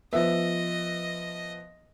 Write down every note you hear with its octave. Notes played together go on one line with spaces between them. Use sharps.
F3 B3 D#5 E5